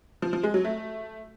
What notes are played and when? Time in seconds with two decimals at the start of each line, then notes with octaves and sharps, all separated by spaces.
0.22 F3
0.33 F3
0.43 G#3
0.54 F#3
0.65 A3